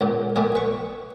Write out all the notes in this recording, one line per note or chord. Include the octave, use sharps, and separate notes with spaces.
C#2 A#2
A#2 G3 A3 G#4
B4 C#6